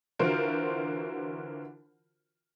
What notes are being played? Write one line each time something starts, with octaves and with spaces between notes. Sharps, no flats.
D3 E3 F4 F#4 A#4 C5